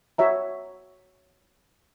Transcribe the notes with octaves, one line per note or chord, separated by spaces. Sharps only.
F#4 C#5 E5 A#5